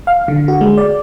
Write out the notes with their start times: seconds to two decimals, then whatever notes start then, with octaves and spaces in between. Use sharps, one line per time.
0.07 F5
0.28 D3
0.48 F#4
0.61 G#3
0.78 D5